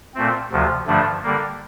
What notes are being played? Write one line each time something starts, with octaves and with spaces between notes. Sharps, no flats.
A#2 A3 C4
D2 C3 F3
G2 D3 F3 A3 D4
D3 G3 A#3